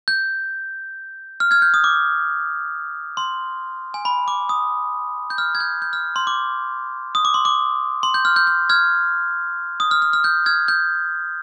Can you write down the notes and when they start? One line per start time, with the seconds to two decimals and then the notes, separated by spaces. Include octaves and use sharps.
0.08 G6
1.40 F6
1.51 F6 G#6
1.62 G6
1.74 D#6
1.84 D6
3.17 C6
3.94 G#5
4.05 B5
4.28 D6
4.49 D#6
5.30 G6
5.38 F6
5.55 G#6
5.60 G6
5.82 G6
5.93 F6
6.16 C6
6.27 D6
7.15 D#6
7.25 D6
7.34 C6
7.45 D6
8.03 C6
8.14 G6
8.25 F6
8.36 G6
8.47 G6
8.69 F6 G#6
9.80 D#6
9.91 F6
10.02 F6
10.13 F6
10.24 G6
10.46 F6 G#6
10.68 G6